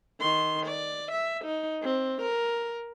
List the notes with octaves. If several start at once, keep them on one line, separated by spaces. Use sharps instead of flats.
D#3 C6
D5
E5
D#4
C4
A#4